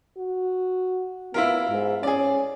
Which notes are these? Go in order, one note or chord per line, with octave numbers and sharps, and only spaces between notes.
F#4
B3 E4 F4 A#4
G#2
C#4 G#4 D5